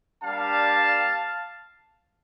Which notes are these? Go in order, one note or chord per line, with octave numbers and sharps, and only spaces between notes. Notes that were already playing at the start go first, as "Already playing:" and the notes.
G3 A#3 D4 G4 F5 A5